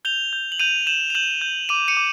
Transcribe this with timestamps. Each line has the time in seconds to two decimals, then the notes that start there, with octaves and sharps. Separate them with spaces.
0.05 G6 F7 G7
0.33 G6
0.52 F#7
0.59 G6 D#7 F7
0.87 G6 E7 F#7
1.10 F7
1.15 G6 E7 F#7
1.41 G6
1.69 D6 D#7 F7
1.88 C#7 D#7
1.97 D6